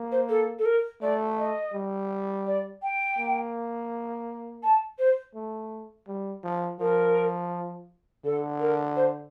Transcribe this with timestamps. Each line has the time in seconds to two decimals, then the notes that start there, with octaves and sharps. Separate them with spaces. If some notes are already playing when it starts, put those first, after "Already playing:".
Already playing: A#3
0.12 C5
0.29 A4
0.59 A4
0.66 A#4
1.02 A3 D5
1.38 D#5
1.74 G3
2.47 D5
2.83 G5
3.18 A#3
4.63 A5
4.99 C5
5.35 A3
6.08 G3
6.44 F3
6.79 F3 A#4
8.24 D3 A4
8.60 A#4
8.96 C5